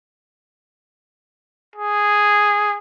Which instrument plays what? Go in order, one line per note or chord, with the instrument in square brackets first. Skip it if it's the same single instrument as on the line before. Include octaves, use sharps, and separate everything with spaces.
[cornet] G#4